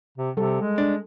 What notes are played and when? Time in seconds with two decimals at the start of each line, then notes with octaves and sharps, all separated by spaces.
0.18 C3
0.37 C3 G3 A4
0.61 G#3
0.78 D4